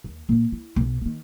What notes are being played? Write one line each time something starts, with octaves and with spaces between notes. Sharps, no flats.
D#2
A#2 A#3
E4
B1 B2
D3 D#3